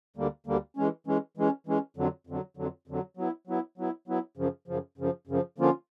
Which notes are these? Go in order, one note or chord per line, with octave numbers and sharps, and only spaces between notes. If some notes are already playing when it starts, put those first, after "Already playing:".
D2 D3 G3 A#3
D2 D3 G3 A#3
E3 G#3 C#4
E3 G#3 C#4
E3 G#3 C#4
E3 G#3 C#4
F2 D3 F#3
F2 D3 F#3
F2 D3 F#3
F2 D3 F#3
F#3 B3 E4
F#3 B3 E4
F#3 B3 E4
F#3 B3 E4
F#2 C#3 F3
F#2 C#3 F3
F#2 C#3 F3
F#2 C#3 F3
D3 F3 A#3 C#4 F4